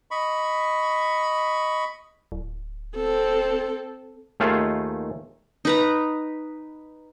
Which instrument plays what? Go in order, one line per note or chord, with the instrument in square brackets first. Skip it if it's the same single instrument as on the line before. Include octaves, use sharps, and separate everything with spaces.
[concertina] D#5 B5 C#6
[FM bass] D1
[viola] C4 A4
[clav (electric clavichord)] D#2 D#3 A3 F4 G#4 F5
[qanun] D#4 B4 A#5